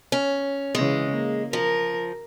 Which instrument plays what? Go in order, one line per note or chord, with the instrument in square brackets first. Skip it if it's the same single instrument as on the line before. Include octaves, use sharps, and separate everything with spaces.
[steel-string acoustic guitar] C#4
[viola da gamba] C#3 E3 [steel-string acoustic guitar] G#3
[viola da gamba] A#3
[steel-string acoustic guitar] F3 [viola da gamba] A#4